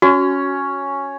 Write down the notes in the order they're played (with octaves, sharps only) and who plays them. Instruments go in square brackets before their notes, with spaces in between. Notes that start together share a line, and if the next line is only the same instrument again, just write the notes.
[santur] C#4 [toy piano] F#4